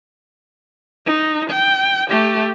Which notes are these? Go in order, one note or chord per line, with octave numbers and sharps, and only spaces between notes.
D#4
G5
A3 G4